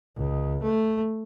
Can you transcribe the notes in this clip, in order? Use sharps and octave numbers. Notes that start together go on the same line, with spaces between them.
C#2
A3